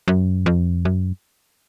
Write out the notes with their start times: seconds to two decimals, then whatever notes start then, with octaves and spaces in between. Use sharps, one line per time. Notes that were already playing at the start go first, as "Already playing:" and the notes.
0.08 F#2
0.46 F2
0.85 F#2